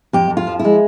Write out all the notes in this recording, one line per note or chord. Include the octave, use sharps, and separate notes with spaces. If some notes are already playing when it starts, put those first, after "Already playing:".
F2 G4
F2
F4
F3
E4
G#3